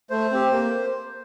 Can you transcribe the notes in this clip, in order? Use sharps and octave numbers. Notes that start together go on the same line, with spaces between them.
A3 C5
C4 G4
A#3